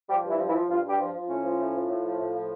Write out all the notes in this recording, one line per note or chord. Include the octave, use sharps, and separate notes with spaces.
F3 G3 G4
G2 E3 E4
F3
E3 E4
F3
G2 F3 F4
G2
G3 G4
F3
F3
A2 C#4
F3
A2
F3
A2
F3
A2
F3